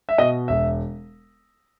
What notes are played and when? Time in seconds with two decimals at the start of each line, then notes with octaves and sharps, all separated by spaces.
0.09 E5
0.18 B2 D#5
0.48 E1 E5